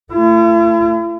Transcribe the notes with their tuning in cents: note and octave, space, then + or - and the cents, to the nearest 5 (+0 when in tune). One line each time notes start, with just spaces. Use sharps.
A3 +20 E4 +45